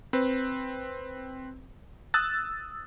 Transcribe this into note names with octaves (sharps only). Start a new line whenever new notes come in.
C4 B4
D#6 E6 F#6 A6